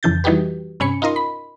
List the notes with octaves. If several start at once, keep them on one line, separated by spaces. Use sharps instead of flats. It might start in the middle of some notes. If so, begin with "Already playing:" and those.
F2 C#3 E3 G6 A6
E3 G3 D#4 F#4 G4 B4
G2 C3 C#4 G#5 B5 C#7
D#4 F4 A#4 D#5 C6
B5